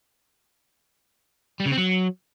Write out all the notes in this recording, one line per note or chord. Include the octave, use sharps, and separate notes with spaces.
G3
C#3
C4
F#3